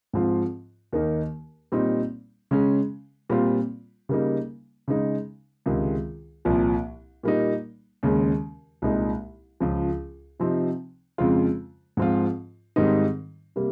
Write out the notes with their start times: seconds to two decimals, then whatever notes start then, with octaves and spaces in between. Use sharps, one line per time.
0.13 G#2 F3 C4 F4
0.93 D#2 D#3 A#3 D#4
1.72 A#2 G3 C4 D#4
2.51 C#3 G#3 C#4
3.30 A#2 G3 C4 F4
4.09 C#3 G3 A#3 D#4
4.88 C#3 G#3 D#4
5.66 C#2 C3 D#3 G#3
6.45 C2 A#2 F3
7.23 A#2 G3 A#3 D#4
8.03 D#2 C#3 G#3 C#4
8.82 C2 A#2 G#3 D#4
9.60 C#2 C#3 F3
10.40 C3 F3 C4 D#4
11.18 F2 C#3 G#3 C4 F4
11.97 G#2 F3 C4 F4
12.76 G#2 D#3 G3 C4 D#4
13.56 C3 G3 A#3